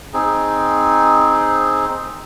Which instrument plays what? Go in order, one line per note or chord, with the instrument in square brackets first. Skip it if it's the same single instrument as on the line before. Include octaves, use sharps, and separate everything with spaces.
[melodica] C4 D#4 G#4